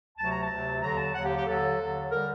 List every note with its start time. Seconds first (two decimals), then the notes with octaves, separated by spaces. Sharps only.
0.17 D2 C3 F#3 A5
0.31 A#5
0.42 A5
0.49 D2 C3 F#3
0.82 D#2 D3 F#3 A#5
0.97 A5
1.14 D#2 D3 F#3 F#5
1.24 G4
1.36 G4
1.46 D#2 D3 F#3 A4
1.78 D#2 D3 F#3
2.11 D3 G3 A#4